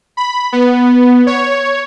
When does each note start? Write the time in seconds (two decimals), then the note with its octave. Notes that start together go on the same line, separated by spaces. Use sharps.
0.17 B5
0.52 B3
1.27 C#5